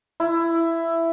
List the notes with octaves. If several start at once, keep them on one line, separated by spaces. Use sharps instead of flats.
E4